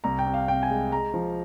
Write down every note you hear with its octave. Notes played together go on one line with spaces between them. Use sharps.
C2 A#5
G5
C3
F5
C3 G5
G#5
G#3
G#3 A#5
F3